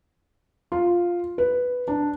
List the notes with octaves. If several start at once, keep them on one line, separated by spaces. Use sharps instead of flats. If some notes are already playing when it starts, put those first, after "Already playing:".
F4
B4
D4